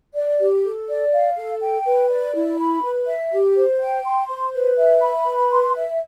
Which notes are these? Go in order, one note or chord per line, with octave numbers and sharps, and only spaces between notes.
D5
G4
A4
D5
F5
A4
G5
B4
D5
E4
B5
B4
E5
G4
C5
G5
C6
C5
B4
E5
B5
B4
C6
E5